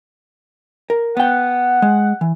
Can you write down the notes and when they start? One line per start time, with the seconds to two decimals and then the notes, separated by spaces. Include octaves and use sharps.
0.90 A#4
1.17 B3 F#5 G5
1.82 G#3
2.21 E3